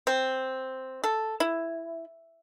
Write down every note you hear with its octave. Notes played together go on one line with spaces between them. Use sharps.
C4
A4
E4